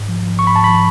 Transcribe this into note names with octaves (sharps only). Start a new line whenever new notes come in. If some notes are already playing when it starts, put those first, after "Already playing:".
Already playing: G#2
F3
F3
G#2 C#6
B5
G#2 A5
F3 B5